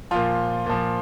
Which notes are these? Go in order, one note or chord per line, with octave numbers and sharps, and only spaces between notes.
A#2 F3 F4
A#2 F3